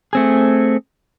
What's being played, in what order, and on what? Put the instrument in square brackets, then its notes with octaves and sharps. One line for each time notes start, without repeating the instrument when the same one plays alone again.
[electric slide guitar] A3 C4 G#4